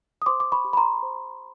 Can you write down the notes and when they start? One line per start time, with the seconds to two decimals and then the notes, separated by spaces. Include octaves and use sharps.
0.22 D#6
0.26 C5 C6 D6
0.40 D6
0.52 B5 C#6
0.65 G4
0.73 B5
0.77 A#5 C6
1.03 C5